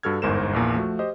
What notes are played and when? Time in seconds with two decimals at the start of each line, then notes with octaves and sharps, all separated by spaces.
0.03 G2 F#4 A4 F6 G#6
0.22 G1 E2 G#2 A#4 C5 E7
0.53 A#1 E2 A#2
0.75 F3 A3 F#4
0.99 G4 C5 D#5